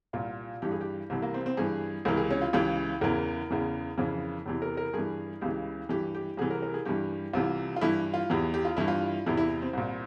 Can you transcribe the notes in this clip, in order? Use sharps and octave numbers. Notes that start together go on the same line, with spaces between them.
C2 A#2 F4
G2 E3 G4
G#4
G4
C2 C3 E3
A#3
C4
C4
G2 E3 G#4
C#2 C3 E3 A#4
G#4
C#4
F4
C#2 C#3 E3 G4
E2 C#3 E3 A#4
E2 C#3 E3
F2 C#3 E3
E2 C3 E3
A#4
A#4
G2 E3 G#4
C#2 C#3 E3 G4
G2 E3 G4
G4
C2 C3 E3 G#4
A#4
A#4
G#4
G2 E3 G4
C2 C3 E3 F4
F4
G2 E3 E4
F4
E2 E3 G4
G4
F4
G2 E3 E4
F4
E2 C3 E3 E4
E4
C4
C2 A#2